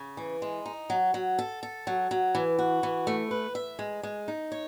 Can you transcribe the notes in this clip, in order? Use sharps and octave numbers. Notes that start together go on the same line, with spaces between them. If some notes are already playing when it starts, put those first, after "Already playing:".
Already playing: C#3
E3
G#3
D#4
F#3
F#3
A4
A4
F#3
F#3
E3
F#4
E3
A3
B4
E5
G#3
G#3
D#4
C#5